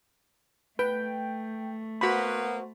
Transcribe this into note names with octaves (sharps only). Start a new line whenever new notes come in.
A3 B4 G5
A#3 B3 F#4 C5 B5